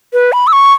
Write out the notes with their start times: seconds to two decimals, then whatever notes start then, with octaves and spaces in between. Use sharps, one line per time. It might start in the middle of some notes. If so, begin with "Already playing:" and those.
0.13 B4
0.32 B5
0.47 E6
0.53 C#6